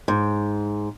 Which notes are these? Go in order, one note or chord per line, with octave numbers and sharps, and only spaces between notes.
G#2